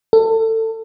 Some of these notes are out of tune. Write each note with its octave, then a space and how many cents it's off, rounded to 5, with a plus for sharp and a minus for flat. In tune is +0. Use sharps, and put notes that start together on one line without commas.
A4 +25